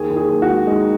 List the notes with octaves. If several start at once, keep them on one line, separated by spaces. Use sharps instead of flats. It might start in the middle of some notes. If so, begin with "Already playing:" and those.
Already playing: D#2 G#4
D#2
G#4
D#2
F#4
G#3
G#3 D#4